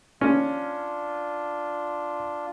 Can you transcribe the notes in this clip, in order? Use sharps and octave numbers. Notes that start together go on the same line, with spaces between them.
C#4 D4 F4